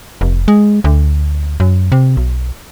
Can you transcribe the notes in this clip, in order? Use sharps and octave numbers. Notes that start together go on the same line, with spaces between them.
F1
G#3
D2
F#2
C3
B1